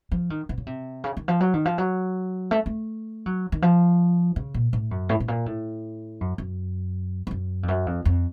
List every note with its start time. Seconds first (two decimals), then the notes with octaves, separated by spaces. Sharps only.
0.12 F3
0.30 D#3
0.49 C3
0.58 C#3
0.67 C3
1.04 C#3
1.17 D#3
1.28 F3
1.40 F#3
1.54 D#3
1.65 F3
1.78 F#3
2.51 A3
2.66 A3
3.26 F#3
3.52 D#3
3.62 F3
4.36 C#3
4.54 A#2
4.73 A2
4.91 F#2
5.09 A2
5.20 A2
5.28 A#2
5.46 A2
6.21 F#2
6.38 F#2
7.27 F2
7.31 F#2
7.63 F2
7.68 F#2
7.86 F2
8.05 F2